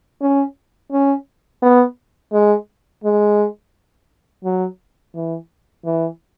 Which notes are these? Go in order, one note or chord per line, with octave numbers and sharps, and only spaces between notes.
C#4
C#4
B3
G#3
G#3
F#3
E3
E3